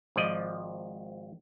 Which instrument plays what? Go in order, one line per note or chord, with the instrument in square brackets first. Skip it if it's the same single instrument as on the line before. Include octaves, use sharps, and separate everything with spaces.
[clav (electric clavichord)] G#1 F3 D5 D#5